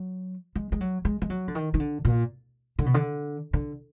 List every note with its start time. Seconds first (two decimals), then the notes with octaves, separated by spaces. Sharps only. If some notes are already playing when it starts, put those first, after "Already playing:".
Already playing: F#3
0.55 G#3
0.72 G#3
0.81 F#3
1.05 G#3
1.22 G#3
1.30 F#3
1.48 D3
1.55 D#3
1.74 D#3
1.80 D3
2.05 A#2
2.79 D3
2.86 B2
2.94 D3
3.53 D3